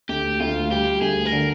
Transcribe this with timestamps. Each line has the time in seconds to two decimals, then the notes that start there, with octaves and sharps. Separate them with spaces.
0.09 D2 G4
0.40 D2 F4
0.71 G3 G4
1.01 D2 G#4
1.25 A#4
1.32 D3